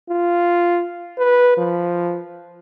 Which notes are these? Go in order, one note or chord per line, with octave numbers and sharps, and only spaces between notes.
F4
B4
F3